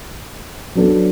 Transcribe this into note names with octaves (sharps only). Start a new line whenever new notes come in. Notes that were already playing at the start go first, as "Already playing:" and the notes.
F#3 B3 D4 A4